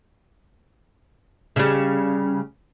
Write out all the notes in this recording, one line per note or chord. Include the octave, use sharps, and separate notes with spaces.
C#3 G3